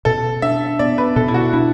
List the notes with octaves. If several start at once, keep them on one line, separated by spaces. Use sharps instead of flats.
B2 A4
D4 E5
B3 D5
B4
B2 A4
E4
F#4
D4 E4